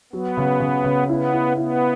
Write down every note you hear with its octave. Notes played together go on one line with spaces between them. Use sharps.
F#3 B3
C#3
C#3
C#3
B3 E4
E4
B3 E4